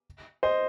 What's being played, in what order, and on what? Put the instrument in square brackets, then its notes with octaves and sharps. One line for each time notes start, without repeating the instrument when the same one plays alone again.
[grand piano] C5 D#5